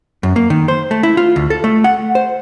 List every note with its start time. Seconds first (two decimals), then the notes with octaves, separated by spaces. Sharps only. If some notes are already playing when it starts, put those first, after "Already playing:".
0.23 F#2
0.36 A#3
0.50 D#3
0.68 C5
0.91 A3
1.03 E4
1.17 F4
1.36 D2
1.50 A4
1.64 A3
1.84 F#5
2.15 C5